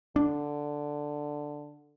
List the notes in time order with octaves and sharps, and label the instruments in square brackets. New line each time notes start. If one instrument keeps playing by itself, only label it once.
[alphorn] D3 [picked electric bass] D4